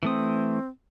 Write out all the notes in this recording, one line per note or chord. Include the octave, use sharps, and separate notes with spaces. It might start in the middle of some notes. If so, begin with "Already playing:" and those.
E3 A3 C4 D#6